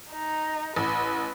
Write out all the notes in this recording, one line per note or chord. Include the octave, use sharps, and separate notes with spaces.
D#4
A1 B4